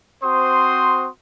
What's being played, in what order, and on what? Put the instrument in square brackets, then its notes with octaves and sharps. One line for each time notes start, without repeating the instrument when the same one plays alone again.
[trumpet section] C4 F#4 C5 C6 D#6